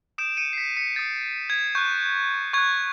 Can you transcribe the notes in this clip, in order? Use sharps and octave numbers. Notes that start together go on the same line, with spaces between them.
D#6 G6 D7 E7
C#7 D#7
C7
B6 C#7
B6 C#7
D#6 G6 A6
G#6
C#6 F#6 G6
C#6 F#6 G#6